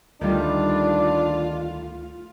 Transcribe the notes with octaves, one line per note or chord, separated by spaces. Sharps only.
D2 D#3 G3 A3 D4 F4